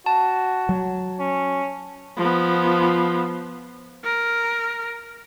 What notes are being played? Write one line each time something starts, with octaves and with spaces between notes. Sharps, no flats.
F#4 A5
F#3
C#4
F3 B3
A#4